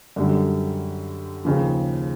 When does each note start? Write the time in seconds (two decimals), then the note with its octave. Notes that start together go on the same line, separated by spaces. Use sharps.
0.16 F#2 D3 G3
1.45 D#2 C#3 F3